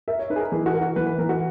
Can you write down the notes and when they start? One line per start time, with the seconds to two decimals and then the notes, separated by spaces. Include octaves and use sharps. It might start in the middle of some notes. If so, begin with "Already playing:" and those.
0.08 A#4 E5
0.19 C#5
0.30 D#4 B4
0.36 G#4
0.40 A#4
0.52 E3 G#4
0.66 F#4
0.74 A#4
0.81 F#4
0.96 E3 B4
1.07 B4
1.18 E3 A#4
1.29 F#4